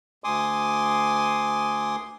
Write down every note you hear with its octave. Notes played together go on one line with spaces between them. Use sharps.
D2 G#5 C6 D6 D#6